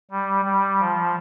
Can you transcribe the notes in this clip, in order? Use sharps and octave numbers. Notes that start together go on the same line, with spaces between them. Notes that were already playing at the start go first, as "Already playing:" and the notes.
G3
G3
F3